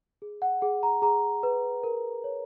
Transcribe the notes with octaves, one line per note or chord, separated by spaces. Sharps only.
G#4
F#5
G#4 F#5
A#5
G#4 A#5
B4
A#4
C#5